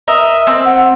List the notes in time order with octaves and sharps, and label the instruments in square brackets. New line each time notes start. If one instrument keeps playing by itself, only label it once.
[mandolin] A#4 D#5 E6 [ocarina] E5
[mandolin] C4 E6
[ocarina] F#5